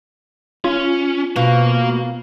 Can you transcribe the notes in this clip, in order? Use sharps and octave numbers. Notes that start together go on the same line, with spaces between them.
C#4 F4
B2 A#3 F5